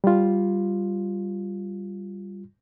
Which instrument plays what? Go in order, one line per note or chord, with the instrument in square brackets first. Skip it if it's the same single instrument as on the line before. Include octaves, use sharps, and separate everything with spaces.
[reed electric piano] G3 F4